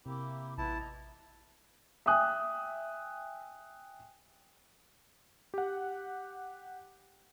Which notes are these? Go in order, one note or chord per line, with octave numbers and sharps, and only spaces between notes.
C3 A#3 E4 G4
A1 B3 E4 F4 B4 A5
D#5 A#5
E5 G5 G#5 D#6 F#6
G4 F#5